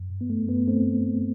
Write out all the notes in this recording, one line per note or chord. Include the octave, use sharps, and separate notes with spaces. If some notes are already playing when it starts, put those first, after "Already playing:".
Already playing: F#2
G2
B3
A3
G2 B3
A3 C4